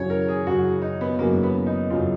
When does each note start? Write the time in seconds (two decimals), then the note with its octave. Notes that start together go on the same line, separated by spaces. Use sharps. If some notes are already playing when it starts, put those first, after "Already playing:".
Already playing: F#2 C#3 F#3 C#5
0.10 A#4
0.28 G#4
0.46 F#2 C#3 F#3 F#4
0.82 D#4
1.01 B3
1.19 F#2 C#3 F#3 A#3
1.43 B3
1.66 D#4
1.90 F#2 C#3 F#3 F4